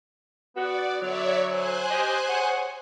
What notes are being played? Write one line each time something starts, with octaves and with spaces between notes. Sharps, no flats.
B3 F#4 D5
D3 F#3 C#5 D5 E5
C5 G#5 F#6
G4 D#5
G#4 C#5 F#5